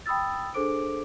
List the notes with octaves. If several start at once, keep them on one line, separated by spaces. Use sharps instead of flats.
G5 B5 D#6 E6 A6
D4 G#4 A4 C5 D6 D7